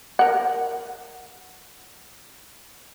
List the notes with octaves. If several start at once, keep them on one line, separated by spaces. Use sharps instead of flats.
A#4 F#5